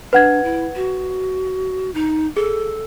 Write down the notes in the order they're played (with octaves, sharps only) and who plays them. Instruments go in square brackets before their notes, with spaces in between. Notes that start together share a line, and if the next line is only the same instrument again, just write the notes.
[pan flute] D4 [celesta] B4 F#5 G#6
[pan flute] E4
F#4
D#4
[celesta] G#4 [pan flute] A4